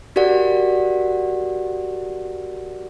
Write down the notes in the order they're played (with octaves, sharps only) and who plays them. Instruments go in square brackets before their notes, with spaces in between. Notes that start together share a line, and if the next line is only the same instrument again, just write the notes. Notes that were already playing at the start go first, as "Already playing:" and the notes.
[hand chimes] F#4 G4 A#4 D5 F#5